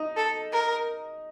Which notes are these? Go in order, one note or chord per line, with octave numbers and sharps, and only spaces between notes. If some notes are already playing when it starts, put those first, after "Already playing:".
Already playing: D#4
A4
A#4